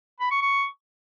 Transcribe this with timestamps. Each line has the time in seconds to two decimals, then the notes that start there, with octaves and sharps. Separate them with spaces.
0.21 B5
0.31 C#6
0.42 C#6